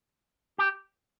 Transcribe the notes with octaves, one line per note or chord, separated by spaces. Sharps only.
G4